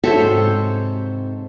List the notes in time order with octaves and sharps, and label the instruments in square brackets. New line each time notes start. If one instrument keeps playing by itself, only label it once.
[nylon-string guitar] E4 F#4 E5 [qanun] A4 C5 C#5
[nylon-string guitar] G#2 C3